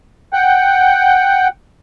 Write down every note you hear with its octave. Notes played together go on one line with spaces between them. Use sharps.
F#5 G5